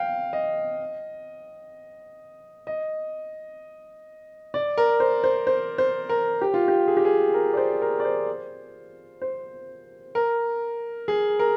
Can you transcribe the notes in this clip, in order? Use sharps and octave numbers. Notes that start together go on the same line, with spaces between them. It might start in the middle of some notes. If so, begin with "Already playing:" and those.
Already playing: F5 G5
D#5
D#5
D5
A#4
C5
C5
C5
C5
A#4
G4
F4
G4
G#4
G4
G#4
A#4
D5
C5
A#4
D5
C5
C5
A#4
G#4
A#4